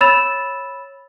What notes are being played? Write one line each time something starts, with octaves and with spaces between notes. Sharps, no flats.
C#5 B5 E6 A6 E7 F7